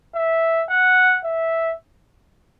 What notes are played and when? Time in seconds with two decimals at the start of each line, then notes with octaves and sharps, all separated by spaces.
0.15 E5
0.69 F#5
1.25 E5